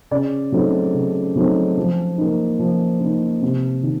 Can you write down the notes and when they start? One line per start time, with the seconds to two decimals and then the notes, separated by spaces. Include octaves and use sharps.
0.11 C#3 D5
0.52 F#3 A3 C4 D#4
0.94 C#3
1.36 F#3 A3 C4 D#4
1.77 F3
2.18 A#3 D#4
2.59 F3
3.00 A#3 D#4
3.42 C3
3.83 D#3